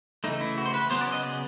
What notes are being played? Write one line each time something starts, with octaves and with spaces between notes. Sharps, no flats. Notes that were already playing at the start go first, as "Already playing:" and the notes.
C#3 E3 A3 D#4
E4
F#4
C5
B4
C#3 F#3 B3 C5
D5
D#5
D5